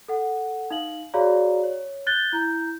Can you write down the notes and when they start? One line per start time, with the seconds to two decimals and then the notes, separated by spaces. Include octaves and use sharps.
0.08 A4 F#5
0.70 D#4 F5 F#7
1.14 F#4 G#4 C#5 D5 F5 A#5
1.63 C#5
2.07 F#6 G6 A6 G7
2.33 E4 A#5 G6